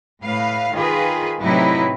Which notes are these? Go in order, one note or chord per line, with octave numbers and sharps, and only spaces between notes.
A2 B4 F5
D#3 F4 G#4 B4
A2 C3 F#3 D#4 E4 B4